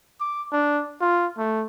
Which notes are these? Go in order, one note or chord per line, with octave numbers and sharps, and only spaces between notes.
D6
D4
F4
A3